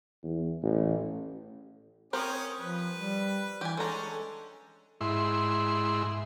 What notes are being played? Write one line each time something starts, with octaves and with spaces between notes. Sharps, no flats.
E2
A1
C4 C#4 G4 A#4 C#5 D#6
F3 B4
G3
E3 G4 G#5
G#3 C#4 D4 A4 C#5 A#5
G#2 E4 C6